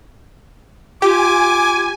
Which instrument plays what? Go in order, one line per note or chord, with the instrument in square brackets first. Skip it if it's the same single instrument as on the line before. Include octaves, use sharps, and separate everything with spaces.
[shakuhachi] F4 [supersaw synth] G4 [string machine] G#5 [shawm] D6